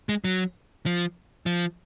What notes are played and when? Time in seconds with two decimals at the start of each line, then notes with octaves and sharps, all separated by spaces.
0.09 G#3
0.24 F#3
0.86 F3
1.46 F3